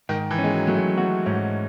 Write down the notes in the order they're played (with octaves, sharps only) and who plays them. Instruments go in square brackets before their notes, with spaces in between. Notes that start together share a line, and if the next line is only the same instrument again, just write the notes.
[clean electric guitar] G#2 [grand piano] D#3
[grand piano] E3
[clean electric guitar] C#4
[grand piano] G#3
F#3
[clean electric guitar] F#3 [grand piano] A3
[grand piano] G#3
[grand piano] A3 [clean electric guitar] F#4
[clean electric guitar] G#2 [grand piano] C#4